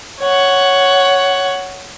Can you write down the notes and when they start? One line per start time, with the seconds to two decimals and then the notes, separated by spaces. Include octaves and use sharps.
0.20 C#5 F#5